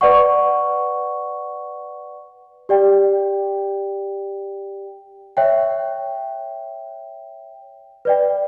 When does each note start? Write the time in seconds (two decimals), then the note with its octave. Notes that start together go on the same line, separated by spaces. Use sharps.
0.01 B4 D5 F#5 C#6
2.69 G4 D5 G5
5.37 C#5 E5 G5
8.05 B4 D5 G5